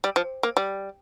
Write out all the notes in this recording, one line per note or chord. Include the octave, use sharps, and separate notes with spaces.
G3
F3
A#3
G3